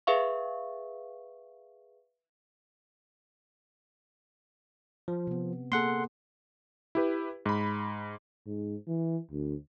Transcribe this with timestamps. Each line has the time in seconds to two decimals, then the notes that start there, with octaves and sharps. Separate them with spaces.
0.07 G#4 B4 E5 F5 C#6
5.08 F3
5.27 C3 B3
5.72 A#3 G#4 A4 F#5 C6
6.95 E4 G4 B4
7.46 G#2 B5
8.46 G#2
8.88 E3
9.31 D2